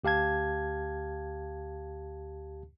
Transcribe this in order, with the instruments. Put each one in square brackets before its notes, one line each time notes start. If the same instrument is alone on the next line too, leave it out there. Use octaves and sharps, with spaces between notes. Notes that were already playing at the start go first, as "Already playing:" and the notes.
[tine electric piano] D2 G4 F5 A5 G#6